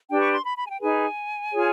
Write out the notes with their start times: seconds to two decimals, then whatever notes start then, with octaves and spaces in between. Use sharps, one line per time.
0.09 D4 G4 B4 G5
0.21 C#6
0.34 C6
0.45 B5
0.57 B5
0.65 G#5
0.69 G5
0.81 D#4 G#4 B4 G#5
1.53 F4 G#4 C#5